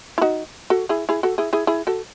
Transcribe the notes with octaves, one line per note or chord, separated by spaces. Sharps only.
E4
D#4 F#4
F#4 A4
E4 G#4
E4 G#4
F#4 A4
E4 G#4
E4 G#4
E4 G#4
F#4 A4